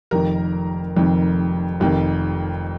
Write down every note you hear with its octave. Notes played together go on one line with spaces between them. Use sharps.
F1 F2 D#3 A#4
F1 F2 D#3
F1 F2 D#3